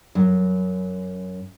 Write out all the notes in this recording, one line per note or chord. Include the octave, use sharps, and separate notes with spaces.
F#2